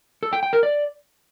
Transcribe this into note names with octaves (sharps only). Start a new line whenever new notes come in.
A4
G5
G5
A#4
D5